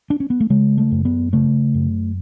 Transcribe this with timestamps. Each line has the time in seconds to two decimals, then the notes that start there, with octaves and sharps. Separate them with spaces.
0.10 D4
0.20 C#4
0.30 B3
0.40 A3
0.50 C#3 G#3
0.78 A3
0.91 F#2
1.05 B3
1.33 C#3 A3
1.74 F#2